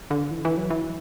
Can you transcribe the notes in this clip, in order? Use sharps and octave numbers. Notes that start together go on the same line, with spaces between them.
D3
E3
E3
F#3
E3